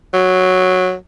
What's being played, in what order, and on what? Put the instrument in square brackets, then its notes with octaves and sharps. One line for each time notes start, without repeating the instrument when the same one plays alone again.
[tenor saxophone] F#3